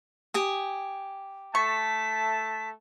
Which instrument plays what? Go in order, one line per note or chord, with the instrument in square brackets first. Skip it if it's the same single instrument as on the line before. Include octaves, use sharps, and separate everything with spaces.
[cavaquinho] G4 G#5 D#6
[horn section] A3 A5 [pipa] C#6 [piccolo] B6